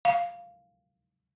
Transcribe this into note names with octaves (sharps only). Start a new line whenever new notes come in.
F5